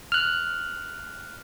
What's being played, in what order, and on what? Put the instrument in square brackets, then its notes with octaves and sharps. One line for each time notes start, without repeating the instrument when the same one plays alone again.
[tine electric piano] F6 F#6